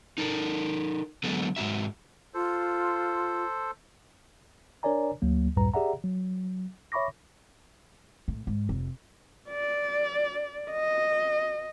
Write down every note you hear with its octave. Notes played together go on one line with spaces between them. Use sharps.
D#4 A4 A#4
D3 F#3 G#3 A3 B3 A4
G#2 G3 F#4 E5
F4 A4 C5
D4 A#4 C#5 D5 G#5 A#5
D2 F#3 A#3
C#2 F#2 A2 G3 B4 A#5
G4 G#4 D5 E5 F#5 A#5
F#3
C#5 E5 B5 C#6 D6 A#6
A2
G#2
F1
D5
D#5